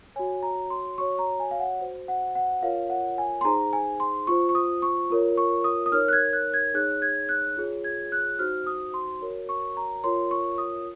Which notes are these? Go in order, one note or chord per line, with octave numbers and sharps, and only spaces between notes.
F#4 C#5 G#5
A#5
C6
F#4 C#5 C#6
A#5
G#5
F5
F#5
F#4 C5
F#5
F#5
F4 A#4 C#5 F5
F#5
G#5
C6
D#4 G#4 C5 A#5
G#5
C6
F4 C5 C#6
C#6
D#6
C#6
F4 A#4 C#5
C#6
D#6
D#6
D#4 A#4 C#5 F6
F#6
G#6
F#6
G#6
D#4 G#4 C#5 F#6
G#6
F#6
F4 G#4 C#5
G#6
F#6
D#4 F#4 C5 F6
D#6
C6
F#4 A#4 C#5
C#6
A#5
F4 A#4 C#5 C6
C#6
D#6